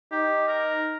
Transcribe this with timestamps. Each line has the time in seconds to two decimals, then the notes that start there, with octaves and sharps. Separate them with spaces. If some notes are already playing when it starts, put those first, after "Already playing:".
0.12 D#4 G4
0.48 A#4